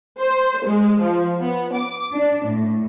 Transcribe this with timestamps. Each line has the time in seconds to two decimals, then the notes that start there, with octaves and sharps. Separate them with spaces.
0.21 C5
0.67 G#3
1.01 F3
1.41 B3
1.75 D6
2.14 D4
2.49 A2